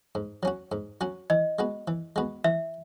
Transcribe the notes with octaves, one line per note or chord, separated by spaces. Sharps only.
G#2
F#3 C#4 F#4
G#2
F#3 C#4 F#4
E3 D#5
G#3 B3 F#4
E3
G#3 B3 F#4
E3 E5